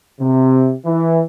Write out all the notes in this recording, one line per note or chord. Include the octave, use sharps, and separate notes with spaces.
C3
E3